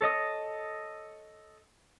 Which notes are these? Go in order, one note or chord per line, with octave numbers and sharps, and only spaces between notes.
A4 C#5 D#5 D#6